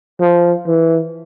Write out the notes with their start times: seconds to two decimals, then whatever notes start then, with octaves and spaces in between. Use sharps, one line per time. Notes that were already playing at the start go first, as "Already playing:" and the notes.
0.20 F3
0.67 E3